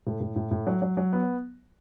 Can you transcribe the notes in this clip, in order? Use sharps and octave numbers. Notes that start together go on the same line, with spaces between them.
A2
A2
A2
A2
F#3
F#3
F#3
B3